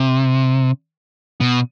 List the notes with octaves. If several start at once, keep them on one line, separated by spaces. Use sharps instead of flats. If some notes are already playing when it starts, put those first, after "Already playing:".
Already playing: C3
B2